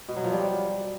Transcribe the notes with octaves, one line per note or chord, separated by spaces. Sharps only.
B2
F#3
F3
G3